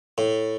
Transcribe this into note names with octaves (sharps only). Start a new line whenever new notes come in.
A2